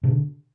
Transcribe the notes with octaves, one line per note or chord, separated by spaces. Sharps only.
B2 D3